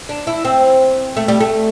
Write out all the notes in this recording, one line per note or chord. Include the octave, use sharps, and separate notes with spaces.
D4
E4
C4
A3
G3
A3